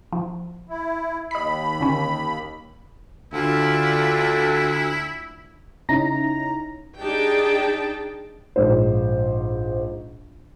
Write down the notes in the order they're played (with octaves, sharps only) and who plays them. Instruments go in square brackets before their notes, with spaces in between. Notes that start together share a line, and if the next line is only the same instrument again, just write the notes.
[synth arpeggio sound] F3
[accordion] E4
[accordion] D#2 B5 [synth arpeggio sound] D#5 B6
[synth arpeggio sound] D3 C#4
[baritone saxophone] D2 [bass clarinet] D3 [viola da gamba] D4 F4 [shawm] E4
[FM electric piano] C#3 C#4 D#4 E4 A#5 A#6
[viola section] D4 D#4 G4 G#4 G5 A5
[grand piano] A#1 G#2 C5